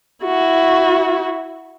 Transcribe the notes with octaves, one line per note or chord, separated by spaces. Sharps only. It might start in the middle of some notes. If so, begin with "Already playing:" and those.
E4 F#4